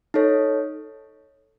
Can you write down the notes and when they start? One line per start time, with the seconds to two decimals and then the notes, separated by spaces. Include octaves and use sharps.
0.14 D#4 A4 C#5